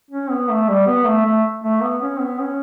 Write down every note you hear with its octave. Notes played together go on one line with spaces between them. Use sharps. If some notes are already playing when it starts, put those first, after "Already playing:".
C#4
B3
A3
G3
B3
A3
A3
A3
B3
C#4
B3
C#4